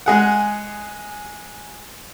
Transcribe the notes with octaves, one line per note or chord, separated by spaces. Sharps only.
G#3 G#4 F#5